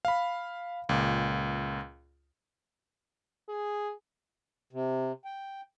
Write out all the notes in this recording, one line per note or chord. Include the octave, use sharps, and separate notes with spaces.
F5 B5
C#2 A#2
G#4
C3
G5